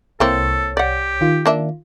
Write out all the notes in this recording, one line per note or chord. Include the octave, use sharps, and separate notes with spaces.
C2 A#3 C4 E4 A4 C#5
G4 D5 F#5
D#3 F4
A#3 D4 E5